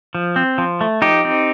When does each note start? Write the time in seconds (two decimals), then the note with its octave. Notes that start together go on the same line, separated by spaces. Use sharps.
0.15 F3
0.36 C4
0.58 F3
0.81 A3
1.02 F3 D#4 G4
1.25 C4